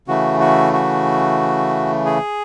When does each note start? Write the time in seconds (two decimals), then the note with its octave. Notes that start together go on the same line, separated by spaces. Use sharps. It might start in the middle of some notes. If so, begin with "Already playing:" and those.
0.08 C#3 E3 A3 F#4
0.40 F#4
0.73 F#4
2.06 G#4